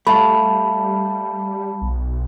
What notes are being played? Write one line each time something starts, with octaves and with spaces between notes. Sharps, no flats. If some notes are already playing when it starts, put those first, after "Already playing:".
G3 A3 F5 A5 B5
B1